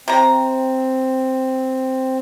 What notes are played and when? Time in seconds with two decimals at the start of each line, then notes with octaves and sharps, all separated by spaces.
0.08 C3 C4 A#5